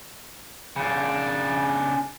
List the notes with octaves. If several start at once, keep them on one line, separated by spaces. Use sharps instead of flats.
C#3 D4